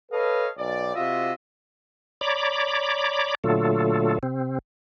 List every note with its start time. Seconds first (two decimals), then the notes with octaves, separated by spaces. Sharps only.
0.12 A4 B4 C#5 D#5 F5
0.58 B1 D5
0.96 C3 F4 F#4 D#5 E5
2.21 C#5 D5 A#5 B5 D6
3.44 A#2 D3 F#3 A3 F4 A4
4.23 C3 C4